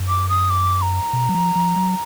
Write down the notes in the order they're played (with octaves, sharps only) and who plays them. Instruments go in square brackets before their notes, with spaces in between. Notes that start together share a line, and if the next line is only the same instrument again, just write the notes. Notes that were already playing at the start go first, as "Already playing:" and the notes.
Already playing: [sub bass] F#2
[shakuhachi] D6
D#6
D6
A#5
[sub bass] B2
F#3
F3
F3
F#3